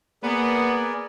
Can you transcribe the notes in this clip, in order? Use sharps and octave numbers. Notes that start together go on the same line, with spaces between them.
A#3 B3 G#4 A#4 D5